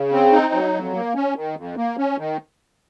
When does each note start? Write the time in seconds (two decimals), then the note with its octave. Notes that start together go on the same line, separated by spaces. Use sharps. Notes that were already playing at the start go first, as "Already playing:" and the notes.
Already playing: C#3
0.12 C4
0.32 D#4
0.53 F#3
0.74 F2
0.95 A#3
1.15 C#4
1.36 D#3
1.56 F2
1.77 A#3
1.98 C#4
2.18 D#3